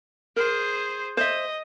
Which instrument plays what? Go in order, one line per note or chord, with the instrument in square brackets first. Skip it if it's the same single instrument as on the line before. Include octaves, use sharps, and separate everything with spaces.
[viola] G#4 C5 [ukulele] A#4
[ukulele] C5 E5 [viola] D#5